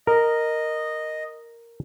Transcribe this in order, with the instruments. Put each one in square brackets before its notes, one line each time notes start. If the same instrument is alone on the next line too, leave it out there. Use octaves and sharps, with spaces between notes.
[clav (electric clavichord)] A#4 [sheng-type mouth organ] D#5